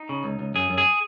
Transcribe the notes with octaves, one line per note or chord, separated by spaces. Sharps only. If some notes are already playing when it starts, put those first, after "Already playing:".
Already playing: D#4
C#3
C#2
C#2
F#2 G#4
F#2
G#4